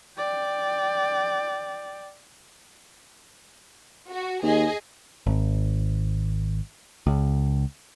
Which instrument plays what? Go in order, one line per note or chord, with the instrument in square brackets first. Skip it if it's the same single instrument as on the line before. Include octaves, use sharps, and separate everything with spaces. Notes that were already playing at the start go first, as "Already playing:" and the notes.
[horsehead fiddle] D5 G5
[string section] F#4
[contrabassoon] D#2 [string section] G#4 D#5
[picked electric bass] G#1
C#2